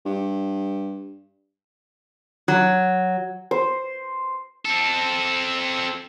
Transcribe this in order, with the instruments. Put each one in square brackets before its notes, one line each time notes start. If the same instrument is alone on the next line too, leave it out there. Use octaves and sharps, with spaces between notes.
[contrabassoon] G2
[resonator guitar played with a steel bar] F#3
[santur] C5
[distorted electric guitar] C4 A4